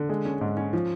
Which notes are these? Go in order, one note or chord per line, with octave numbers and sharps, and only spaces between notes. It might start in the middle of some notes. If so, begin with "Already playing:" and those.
Already playing: D3
G#3
C#4
G#2
C#4
F3